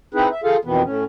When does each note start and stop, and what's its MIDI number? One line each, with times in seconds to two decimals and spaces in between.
0.14 0.28 60
0.14 0.28 63
0.14 0.28 64
0.14 0.28 68
0.14 0.28 71
0.31 0.41 76
0.44 0.57 65
0.44 0.57 68
0.44 0.57 69
0.44 0.57 77
0.65 0.82 41
0.65 0.82 47
0.65 0.82 51
0.65 0.82 52
0.65 0.82 59
0.84 1.04 45
0.84 1.04 61